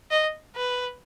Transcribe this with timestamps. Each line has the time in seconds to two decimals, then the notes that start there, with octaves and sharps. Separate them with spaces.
0.11 D#5
0.56 B4